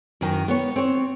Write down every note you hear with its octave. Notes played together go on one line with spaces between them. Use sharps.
F#2 D#3
B3 C#5
C4 C#5